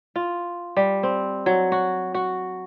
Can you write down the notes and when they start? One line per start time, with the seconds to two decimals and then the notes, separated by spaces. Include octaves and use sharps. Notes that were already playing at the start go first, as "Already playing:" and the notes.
0.16 F4
0.77 G3
1.03 C4
1.46 F#3
1.72 F#4
2.14 F#4